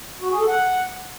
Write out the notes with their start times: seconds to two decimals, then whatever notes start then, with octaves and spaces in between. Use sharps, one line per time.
0.21 F#4
0.30 G#4
0.39 A4
0.48 F#5